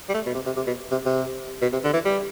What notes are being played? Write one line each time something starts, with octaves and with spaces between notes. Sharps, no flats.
G3
A3
B2
C3
C3
C3
B2
C3
C3
B2
C3
D3
E3
G3